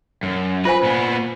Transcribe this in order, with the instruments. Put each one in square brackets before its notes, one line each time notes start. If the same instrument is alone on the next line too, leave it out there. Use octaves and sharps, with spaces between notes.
[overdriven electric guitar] F#2
[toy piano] F4 C5 G#5 [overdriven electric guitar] B4
[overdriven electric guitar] A#2 B3